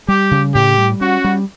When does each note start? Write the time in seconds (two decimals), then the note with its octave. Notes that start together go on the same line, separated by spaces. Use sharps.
0.08 G3 G4
0.31 C#3
0.55 A2 G4
0.78 G3
1.01 C#4 F#4
1.24 G3